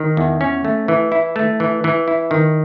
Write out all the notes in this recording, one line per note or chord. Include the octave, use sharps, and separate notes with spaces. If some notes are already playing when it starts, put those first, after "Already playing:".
Already playing: D#3
E2
C#4
A3
E3
E4
A3
E3
E3
E4
D#3